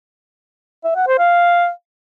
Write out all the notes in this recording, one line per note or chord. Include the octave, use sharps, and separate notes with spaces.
E5
F#5
C5
F5